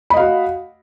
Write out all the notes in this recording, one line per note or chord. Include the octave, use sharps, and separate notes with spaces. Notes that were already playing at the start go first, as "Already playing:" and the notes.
F#4 D#5 F5 B5